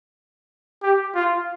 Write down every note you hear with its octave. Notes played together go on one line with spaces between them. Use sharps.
G4
F4